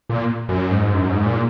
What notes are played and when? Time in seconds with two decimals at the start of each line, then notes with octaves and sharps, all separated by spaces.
0.09 A#2
0.49 F#2
0.71 G#2
0.94 F#2
1.11 G#2
1.26 A#2